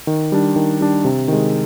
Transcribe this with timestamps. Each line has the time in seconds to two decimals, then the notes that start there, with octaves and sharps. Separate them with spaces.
0.07 D#3
0.32 G3 D4
0.56 D#3
0.80 G3 D4
1.05 C3
1.28 D#3 G#3